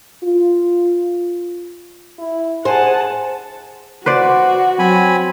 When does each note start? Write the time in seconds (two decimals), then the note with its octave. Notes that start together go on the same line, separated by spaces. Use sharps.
0.24 F4
2.19 E4
2.65 G#4 C5 F#5 G#5 A5
4.06 F#4 B4 C5 D5
4.79 F#3 C4 G#5 B5